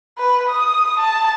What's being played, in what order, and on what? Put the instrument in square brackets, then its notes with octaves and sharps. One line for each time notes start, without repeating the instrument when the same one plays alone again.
[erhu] B4
D#6
A5